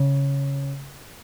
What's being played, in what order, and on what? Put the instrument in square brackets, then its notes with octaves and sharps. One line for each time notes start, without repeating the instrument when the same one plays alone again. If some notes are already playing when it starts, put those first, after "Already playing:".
Already playing: [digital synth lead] C#3